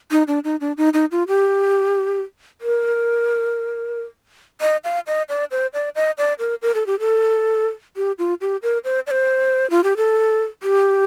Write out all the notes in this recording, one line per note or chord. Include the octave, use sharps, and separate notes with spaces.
D#4
D4
D#4
D4
D#4
D#4
F4
G4
A#4
D#5
F5
D#5
D5
C5
D5
D#5
D5
A#4
A#4
A4
G4
A4
G4
F4
G4
A#4
C5
D5
C5
F4
G4
A4
G4